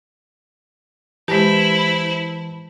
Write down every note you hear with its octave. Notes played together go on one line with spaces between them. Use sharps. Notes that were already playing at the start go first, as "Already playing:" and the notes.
E3 G#3 E4 G4 C5 A5